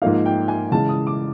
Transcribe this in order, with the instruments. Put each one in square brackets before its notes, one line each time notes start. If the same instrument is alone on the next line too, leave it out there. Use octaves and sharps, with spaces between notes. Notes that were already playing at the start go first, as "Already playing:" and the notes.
[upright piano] G#2 F3 A#3 D#4 F5
G5
G#5
C#3 E3 G#3 A5
D#6
D6